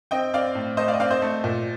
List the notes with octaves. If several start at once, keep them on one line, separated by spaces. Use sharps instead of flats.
C4 D#5 G5
C4 D5 F5
A2
A3 C5 D#5
D5 F5
D#5
C4 D5 F5
C5 D#5
A3
A#2